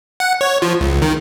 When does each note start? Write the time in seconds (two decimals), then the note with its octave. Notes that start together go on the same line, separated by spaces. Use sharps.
0.20 F#5
0.41 C#5
0.62 F3
0.81 C#2
1.02 D#3